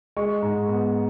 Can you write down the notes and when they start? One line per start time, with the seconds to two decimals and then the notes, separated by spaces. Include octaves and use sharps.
0.16 G#3 C#6
0.42 G#2
0.68 B3